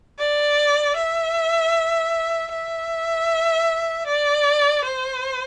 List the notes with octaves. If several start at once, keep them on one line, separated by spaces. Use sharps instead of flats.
D5
E5
E5
D5
C5